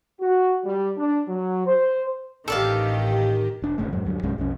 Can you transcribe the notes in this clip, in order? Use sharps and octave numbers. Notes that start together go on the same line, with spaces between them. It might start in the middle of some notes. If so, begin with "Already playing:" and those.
F#4
G3
D4
F#3
C5
A1 D#3 G4 A4 D5 F5
E1 D4
D1 G#1 C#3 A3
F2 G#2 F#3
D2 G2 F#3
C2 G2 G#3 C#4
B1 F2 C#4